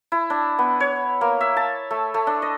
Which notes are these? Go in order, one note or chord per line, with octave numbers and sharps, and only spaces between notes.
E4
D4
B3
C#5
A#3
E5
A5
A3
A3
D4
D#5